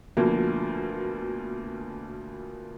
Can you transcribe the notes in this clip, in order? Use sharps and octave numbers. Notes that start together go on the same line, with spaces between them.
D2 B2 F3 A#3